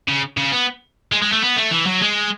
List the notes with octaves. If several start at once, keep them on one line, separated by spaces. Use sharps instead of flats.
C#3
C#3
B3
G#3
G#3
A3
B3
A3
E3
F#3
G#3